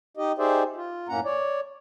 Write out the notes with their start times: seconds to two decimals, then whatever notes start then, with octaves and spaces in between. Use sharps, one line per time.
0.17 D#4 G4 D#5
0.38 D#4 G4 G#4 C5 D5 E5
0.76 F4
1.08 F#2 A2 A#3 C#4 F#5 A#5
1.24 C#5 D5